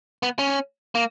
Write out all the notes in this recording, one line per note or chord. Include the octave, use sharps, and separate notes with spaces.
B3
C#4
A#3